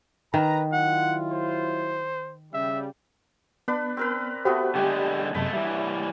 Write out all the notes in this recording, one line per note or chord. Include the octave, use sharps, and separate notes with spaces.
D#3 B4 A#5
F#3 E4 F4 F#5
C5
C#3 G3 E5
B3 D4 B4
C4 A#4 B4
A3 B3 F#4 G4 B4 C5
D3 G3 G#3 G4 G#5
F#2 C3 G#3 A3 A4 B5
E3 G3 E5